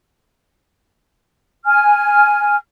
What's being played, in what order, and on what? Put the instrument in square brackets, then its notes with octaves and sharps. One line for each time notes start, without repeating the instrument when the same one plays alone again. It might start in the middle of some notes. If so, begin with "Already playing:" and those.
[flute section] G#5 F6